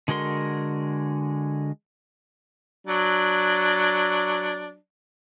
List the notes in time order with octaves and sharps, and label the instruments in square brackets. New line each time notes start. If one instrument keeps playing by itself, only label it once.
[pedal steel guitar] D3 G#3 F#4 A#4 C6
[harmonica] F#3 D4